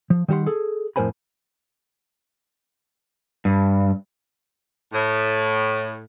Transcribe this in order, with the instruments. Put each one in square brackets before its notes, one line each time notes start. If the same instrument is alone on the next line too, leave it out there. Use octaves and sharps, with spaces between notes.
[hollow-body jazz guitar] F3
D#3 G3 G4 F#5 C6
G#4 A4
F2 A2 A#4 C5 G#5 B5
[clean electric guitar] G2
[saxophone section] A2